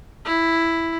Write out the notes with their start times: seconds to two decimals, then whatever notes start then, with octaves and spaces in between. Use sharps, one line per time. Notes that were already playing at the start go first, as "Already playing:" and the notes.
0.25 E4